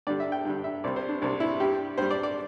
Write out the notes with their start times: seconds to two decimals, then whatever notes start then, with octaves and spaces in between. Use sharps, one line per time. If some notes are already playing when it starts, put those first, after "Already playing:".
0.07 G2 D3 G3 D5
0.20 E5
0.32 G5
0.45 G2 D3 G3
0.64 E5
0.84 C2 C3 G3 D5
0.96 C5
1.09 D4
1.22 C2 C3 G3 D4
1.40 E4
1.60 G2 G3 G4
1.98 G2 G3 C5
2.11 D5
2.23 D5